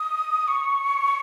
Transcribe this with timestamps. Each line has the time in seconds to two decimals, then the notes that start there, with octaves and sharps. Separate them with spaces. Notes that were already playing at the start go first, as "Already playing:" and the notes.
Already playing: D#6
0.48 C#6